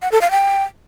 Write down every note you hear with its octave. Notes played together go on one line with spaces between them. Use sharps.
F#5
A4
F5
G5